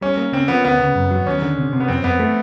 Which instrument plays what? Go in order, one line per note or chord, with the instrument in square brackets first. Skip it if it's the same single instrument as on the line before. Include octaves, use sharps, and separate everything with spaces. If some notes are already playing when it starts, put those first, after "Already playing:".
[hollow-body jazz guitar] G3 [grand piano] C#4
[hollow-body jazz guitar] A#3
[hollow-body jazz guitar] C#3 [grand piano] C4
[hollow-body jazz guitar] F3 [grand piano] B3
[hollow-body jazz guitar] D2 [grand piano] B3
[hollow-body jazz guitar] C#3
F#2
F#3
[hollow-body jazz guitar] D#2 [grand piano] C#4
[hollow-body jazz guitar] D3
C3
C3
[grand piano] B3
[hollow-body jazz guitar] F2 [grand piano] C4
[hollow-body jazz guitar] F2 [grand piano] B3
[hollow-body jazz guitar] A3